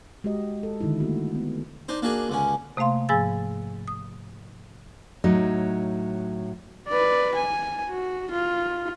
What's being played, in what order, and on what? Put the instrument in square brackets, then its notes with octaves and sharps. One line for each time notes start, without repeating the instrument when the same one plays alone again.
[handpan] G#3 F#4 G4 D#5
A4
D3 D#3 G#3 D#4 E4
A3 A#3 F#4
B3
[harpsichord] D4 D#4 C5
A#3 D4 F#4 G#4
C#2 D3 C#4
[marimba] C3 A3 A#3 F5 C6
G#2 F3 G#4 G#5 E6 A6
D#6
[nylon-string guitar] A2 F#3 D#4
[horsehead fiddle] B4 D5
G#5
F#4
F4